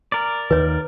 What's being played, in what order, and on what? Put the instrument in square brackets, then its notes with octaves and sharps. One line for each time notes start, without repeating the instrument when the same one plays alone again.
[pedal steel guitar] A#4 D5
[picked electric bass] D#2 D#3 [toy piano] B4 C#5